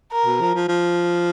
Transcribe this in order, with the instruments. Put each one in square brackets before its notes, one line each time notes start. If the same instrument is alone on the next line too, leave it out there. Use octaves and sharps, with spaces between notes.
[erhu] A#4
[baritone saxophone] B2
F3
F3
F3